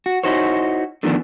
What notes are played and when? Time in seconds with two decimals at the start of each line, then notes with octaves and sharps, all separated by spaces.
0.06 F#4
0.23 D#4 E4 F#4 C5 C#5
1.03 D3 D#3 F3 A3 B3 D4